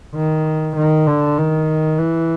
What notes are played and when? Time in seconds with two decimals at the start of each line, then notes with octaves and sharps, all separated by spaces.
0.15 D#3
0.76 D#3
1.07 D3
1.37 D#3
1.98 E3